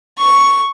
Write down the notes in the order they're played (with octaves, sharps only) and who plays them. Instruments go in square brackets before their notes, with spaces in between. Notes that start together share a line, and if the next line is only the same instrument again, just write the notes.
[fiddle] C#6